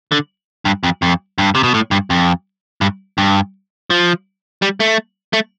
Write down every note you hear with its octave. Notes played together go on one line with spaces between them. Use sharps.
D3
G2
F2
F2
G2
C3
B2
A2
G2
F2
G2
G2
F3
G3
A3
A3